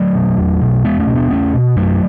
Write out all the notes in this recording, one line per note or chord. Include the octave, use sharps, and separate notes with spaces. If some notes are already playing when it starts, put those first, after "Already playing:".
Already playing: F#3 A3
B2
E2
B2
E2 G#3 B3
A3 C#4
B2
B3 D4
E2 A3 C#4
B2
F#2 F#3 A3